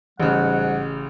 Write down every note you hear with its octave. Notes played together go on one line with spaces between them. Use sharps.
A1 G#2 C#3 G3 F#5